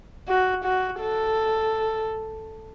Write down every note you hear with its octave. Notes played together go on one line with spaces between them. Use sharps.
F#4
F#4
A4